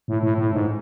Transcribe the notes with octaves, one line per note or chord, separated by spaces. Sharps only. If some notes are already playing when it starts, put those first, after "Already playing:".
A2
A2
A2
G#2